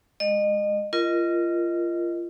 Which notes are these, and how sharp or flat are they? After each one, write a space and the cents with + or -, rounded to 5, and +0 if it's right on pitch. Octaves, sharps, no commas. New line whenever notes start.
G#3 +0 D#5 -30
F4 -25 A#4 +5 D#5 +0